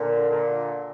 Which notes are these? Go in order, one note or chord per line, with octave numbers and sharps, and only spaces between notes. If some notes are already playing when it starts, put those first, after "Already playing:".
Already playing: A#2 D3
A#2 D3